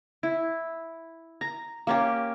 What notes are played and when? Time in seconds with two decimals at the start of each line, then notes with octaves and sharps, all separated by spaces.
0.23 E4
1.41 A#5
1.87 A#3 C#4 G4